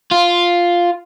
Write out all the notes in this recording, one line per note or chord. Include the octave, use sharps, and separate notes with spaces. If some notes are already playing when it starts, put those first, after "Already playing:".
F4